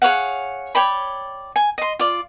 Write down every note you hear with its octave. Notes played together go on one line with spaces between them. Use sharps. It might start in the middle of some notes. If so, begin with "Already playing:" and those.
G#4 C#5 F5 F#5
C#5 D5 G5 B5
G#5
D#5 C6
F4 D5